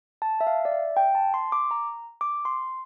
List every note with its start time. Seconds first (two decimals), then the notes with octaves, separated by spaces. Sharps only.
0.22 A5
0.41 E5
0.47 F5
0.65 D5
0.72 E5
0.97 G5
1.15 A5
1.34 C6
1.52 D6
1.71 A#5
2.21 D6
2.45 C6